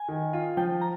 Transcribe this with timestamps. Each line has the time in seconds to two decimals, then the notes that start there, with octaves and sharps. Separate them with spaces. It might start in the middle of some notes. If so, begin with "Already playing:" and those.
Already playing: G#5
0.08 D#3
0.33 F4
0.57 F3 G5
0.81 A#5